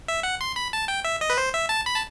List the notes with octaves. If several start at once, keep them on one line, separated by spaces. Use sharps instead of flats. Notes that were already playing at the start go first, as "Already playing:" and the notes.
E5
F#5
C6
B5
A5
G5
E5
D#5
B4
C5
E5
A5
B5
A5